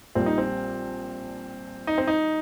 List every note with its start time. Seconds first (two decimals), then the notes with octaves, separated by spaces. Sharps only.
0.15 A#1 A#2 G3 C4
0.26 D#4
0.38 C4
1.87 D#4
1.98 C4
2.07 D#4